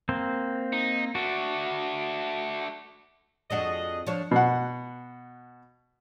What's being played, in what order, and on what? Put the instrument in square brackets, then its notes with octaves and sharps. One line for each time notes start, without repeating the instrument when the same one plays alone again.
[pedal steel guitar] A#3 C4 C5
[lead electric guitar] D#4
[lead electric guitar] A3 D4 [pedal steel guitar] F#4
[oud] F2 D4 F#4 [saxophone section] G#4 D#5
[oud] F3 D4 C#5
[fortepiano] B2 F#5